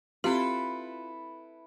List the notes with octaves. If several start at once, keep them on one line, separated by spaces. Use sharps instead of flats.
C4 E4 F4 G4 A4 B4